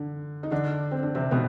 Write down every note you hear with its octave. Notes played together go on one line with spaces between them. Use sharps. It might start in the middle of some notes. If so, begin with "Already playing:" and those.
Already playing: D3
D#4
D3 D4
C4
D4
C3 C4
B2 B3